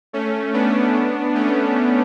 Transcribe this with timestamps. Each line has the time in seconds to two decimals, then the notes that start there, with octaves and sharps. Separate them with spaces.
0.13 A3 C#4
0.53 B3 D4
1.35 A3 C#4